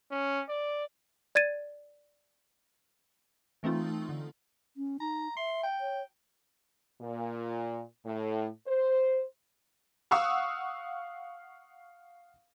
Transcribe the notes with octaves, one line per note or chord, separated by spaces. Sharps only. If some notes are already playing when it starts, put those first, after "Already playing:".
C#4
D5
D5 G#6 A6 D#7
E3 A3 C4 D#4 F4
D3
C#4
D#4 A#5
E5 C6
G5
C#5
A#2
A2
C5
F5 F#5 C#6 D#6 E6